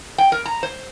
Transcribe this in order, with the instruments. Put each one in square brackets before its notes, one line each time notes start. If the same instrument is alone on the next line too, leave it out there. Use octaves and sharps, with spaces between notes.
[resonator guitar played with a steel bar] G5
A#4
A#5
C5